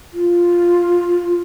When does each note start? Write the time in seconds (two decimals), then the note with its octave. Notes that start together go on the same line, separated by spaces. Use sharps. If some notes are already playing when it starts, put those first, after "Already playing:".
0.13 F4